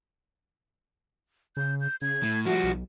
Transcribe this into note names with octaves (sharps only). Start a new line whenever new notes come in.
C#3 G6
G6
C#3 G#6
A2 A3
F3 G3 F#4
B1